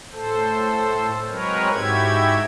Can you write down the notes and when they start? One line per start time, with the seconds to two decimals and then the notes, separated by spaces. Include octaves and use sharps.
0.12 A2 A4 C5
1.28 F#3 G#3 C4 A#4 B4 C#5
1.73 G#2 E4 F#4 G4 E5 G#6